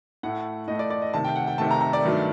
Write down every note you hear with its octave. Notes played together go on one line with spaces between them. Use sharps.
A2 A3 F#5
A2 A3 D#5
D5
D5
D#5
C3 D#3 A3 A5
G5
F#5
G5
C3 D#3 A3 A5
A#5
A#5
D5
G2 D#3 F#3 A3